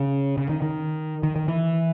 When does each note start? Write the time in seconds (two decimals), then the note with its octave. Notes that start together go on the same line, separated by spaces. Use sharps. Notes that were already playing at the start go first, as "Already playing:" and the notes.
Already playing: C#3
0.37 C#3
0.49 D#3
0.62 D#3
1.23 D#3
1.36 D#3
1.48 E3